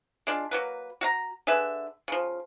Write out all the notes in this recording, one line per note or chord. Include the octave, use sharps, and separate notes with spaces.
G#3 D4 F4
F#3 A#3 B4
F#4 F5 A#5
D3 G#4 B4 E5
C#3 F3